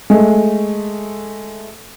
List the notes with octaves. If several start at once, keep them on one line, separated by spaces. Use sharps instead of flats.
G#3 A3